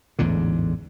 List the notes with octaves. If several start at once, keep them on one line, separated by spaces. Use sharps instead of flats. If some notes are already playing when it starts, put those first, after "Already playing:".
A1 E2 G#2 D3